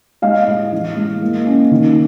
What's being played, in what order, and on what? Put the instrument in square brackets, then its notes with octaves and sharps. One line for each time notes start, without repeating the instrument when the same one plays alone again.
[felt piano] G#3 D#5 F5
A2
E3
G#3
A#3
C#4
D#3